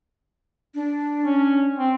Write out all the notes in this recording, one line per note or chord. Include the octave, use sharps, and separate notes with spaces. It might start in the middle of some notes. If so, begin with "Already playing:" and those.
D4
C#4
C4